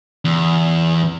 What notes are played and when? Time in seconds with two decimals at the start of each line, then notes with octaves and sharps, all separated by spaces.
0.25 E2